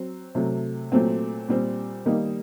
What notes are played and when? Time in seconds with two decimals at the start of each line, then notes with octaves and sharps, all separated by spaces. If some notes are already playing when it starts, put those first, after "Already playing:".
Already playing: F#3 C4
0.35 C3 F#3 A3
0.92 A#2 F#3 A3 C4
1.49 A#2 G3 C4
2.05 D#3 G3 A#3 D#4